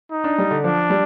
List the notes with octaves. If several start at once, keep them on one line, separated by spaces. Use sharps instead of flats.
D#4
D4
G3
D3
F3 D4
G3